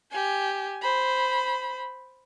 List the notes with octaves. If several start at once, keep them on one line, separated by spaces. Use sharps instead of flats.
G4 G#5
C5 B5